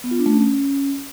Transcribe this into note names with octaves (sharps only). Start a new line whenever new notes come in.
B3
F4
D4
A3
C#4